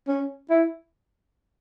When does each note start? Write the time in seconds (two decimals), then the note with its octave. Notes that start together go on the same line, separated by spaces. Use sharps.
0.08 C#4
0.50 E4